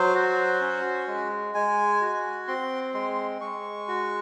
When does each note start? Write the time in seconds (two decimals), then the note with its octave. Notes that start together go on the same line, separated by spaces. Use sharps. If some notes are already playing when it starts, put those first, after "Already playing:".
Already playing: F#3 C5
0.15 F#4
0.61 C#4
1.08 G#3
1.54 G#3 G#5
2.01 F#4
2.48 C4 C6
2.94 G#3 C6
3.41 G#3 C#6
3.88 F#4